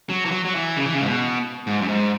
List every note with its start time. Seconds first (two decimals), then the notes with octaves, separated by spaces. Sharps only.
0.10 F#3
0.25 E3
0.31 F#3
0.45 F#3
0.55 E3
0.77 C#3
0.86 E3
0.93 C#3
1.01 G#2
1.06 B2
1.67 G#2
1.81 F#2
1.88 G#2